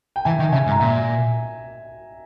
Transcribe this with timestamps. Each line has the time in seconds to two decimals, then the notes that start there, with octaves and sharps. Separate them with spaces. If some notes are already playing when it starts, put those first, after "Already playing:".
0.16 G5
0.25 E3 E5 G#5
0.39 D#3
0.52 C#3 E5 G#5
0.66 G#2
0.71 A#5
0.80 A#2 E5 G#5